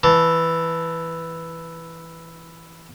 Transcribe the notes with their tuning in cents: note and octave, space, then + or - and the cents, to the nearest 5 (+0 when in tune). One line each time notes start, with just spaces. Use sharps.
E3 +0 A5 +0